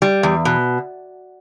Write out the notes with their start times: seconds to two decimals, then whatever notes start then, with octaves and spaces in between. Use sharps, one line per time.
0.02 G3
0.23 E2
0.45 B2